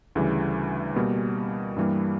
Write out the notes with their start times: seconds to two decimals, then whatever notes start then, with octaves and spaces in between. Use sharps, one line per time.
0.15 D2 C#3 E3 G3
0.96 B2 G3 A#3
1.76 G2 E3 G3 A#3